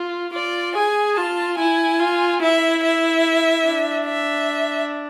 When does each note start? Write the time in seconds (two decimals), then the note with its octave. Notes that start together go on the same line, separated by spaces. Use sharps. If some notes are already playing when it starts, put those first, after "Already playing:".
Already playing: F4
0.33 F4 D5
0.75 G#4 G#5
1.16 F4 A5
1.58 E4 G#5
2.00 F4
2.42 E4 E5
2.83 E5
3.66 D4
4.08 E5